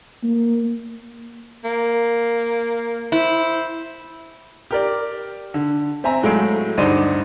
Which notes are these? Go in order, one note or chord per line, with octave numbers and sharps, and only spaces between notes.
A#3
A#3
E4 C5
G4 A#4 D5
D3
C4 E5 G#5 A#5
A2 F#3 G#3 A3 F5 D7
D2 G2 D#4 C5 D5 D#7